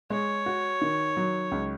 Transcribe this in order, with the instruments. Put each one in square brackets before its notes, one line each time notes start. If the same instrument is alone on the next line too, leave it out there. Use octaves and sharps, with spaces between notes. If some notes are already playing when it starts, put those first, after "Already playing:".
[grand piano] G#3 [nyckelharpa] C#5
[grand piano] F#4
D#3
F#3
C#2